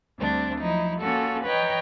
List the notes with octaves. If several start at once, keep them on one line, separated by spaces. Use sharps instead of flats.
D2 D3 G3 C4 D4
F3 F#3 D#4 E4
A#3 C#4 F4 F#4 A4
B4 C#5 D#5 G5 A#5